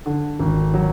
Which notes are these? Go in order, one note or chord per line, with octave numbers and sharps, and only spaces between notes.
D3
G#1
F#3